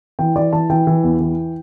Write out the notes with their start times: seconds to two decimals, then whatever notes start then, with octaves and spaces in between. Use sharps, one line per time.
0.19 E3 G5
0.36 E3 D5
0.53 E3 A5
0.70 E3 G5
0.87 E3
1.04 E2
1.21 E3